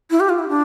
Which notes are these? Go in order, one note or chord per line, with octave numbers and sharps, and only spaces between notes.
E4
G4
F4
E4
D4